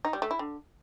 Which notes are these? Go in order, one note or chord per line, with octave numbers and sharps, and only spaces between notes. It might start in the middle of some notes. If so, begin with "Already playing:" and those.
D#4
G3
A3
E4
D3